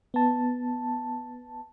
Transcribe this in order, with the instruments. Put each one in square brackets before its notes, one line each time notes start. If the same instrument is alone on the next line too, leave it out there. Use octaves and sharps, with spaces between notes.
[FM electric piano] B3 A5